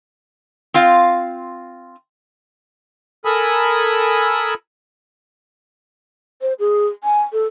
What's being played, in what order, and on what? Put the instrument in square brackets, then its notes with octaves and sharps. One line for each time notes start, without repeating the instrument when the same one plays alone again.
[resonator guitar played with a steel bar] C4 F4 F5
[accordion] A4 A#4 G#5 B5 D#6 E6
[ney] C5
G#4
G#5
A4